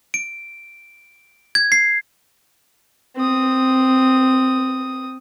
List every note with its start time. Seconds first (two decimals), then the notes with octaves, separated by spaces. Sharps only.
0.14 D7
1.55 G#6
1.72 C7
3.16 C4 D#6